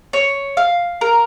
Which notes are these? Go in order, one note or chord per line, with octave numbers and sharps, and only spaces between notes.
C#5
F5
A#4